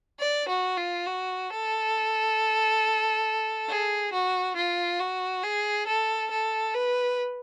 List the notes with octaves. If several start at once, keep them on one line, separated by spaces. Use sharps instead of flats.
D5
F#4
F4
F#4
A4
G#4
F#4
F4
F#4
G#4
A4
A4
B4